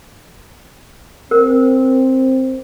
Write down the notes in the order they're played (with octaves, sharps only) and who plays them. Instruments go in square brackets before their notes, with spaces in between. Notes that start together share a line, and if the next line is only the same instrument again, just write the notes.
[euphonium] C4 [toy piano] A#4